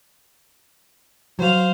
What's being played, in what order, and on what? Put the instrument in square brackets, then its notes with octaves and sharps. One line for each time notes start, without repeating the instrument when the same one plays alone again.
[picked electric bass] F#3 [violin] C5 F5